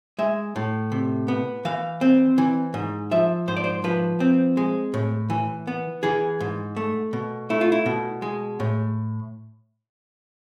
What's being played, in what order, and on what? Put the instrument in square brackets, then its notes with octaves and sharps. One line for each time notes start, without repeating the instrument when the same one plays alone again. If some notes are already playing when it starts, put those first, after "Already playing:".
[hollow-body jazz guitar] G#3 E5
A2
C3
B3
E3 F5
C4
E3
G#2
F3 E5
G#2 C5
D5
C5
F3 B4
C4
G#3
A2
E3
B3
E3 G#4
G#2
A3
B2
A3 E4
F4
E4
B2
G#3
A2